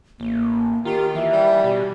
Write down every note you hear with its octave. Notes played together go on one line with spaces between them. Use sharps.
A1 A#3
D#3 F4 G4
E3 E5
G3
B2 G4